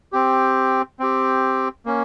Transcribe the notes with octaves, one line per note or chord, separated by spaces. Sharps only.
C4 G4
C4 G4
A#3 C#4